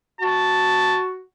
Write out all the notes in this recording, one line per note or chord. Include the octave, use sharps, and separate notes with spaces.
F#4 A5